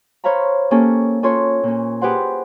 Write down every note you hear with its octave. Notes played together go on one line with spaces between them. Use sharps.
C5 C#5 F5 A#5 B5
A#3 C#4 G4 A4
C#4 F4 A4 B4 C#5 C6
A#2 C#4
G4 G#4 B4 C5 F#5 C6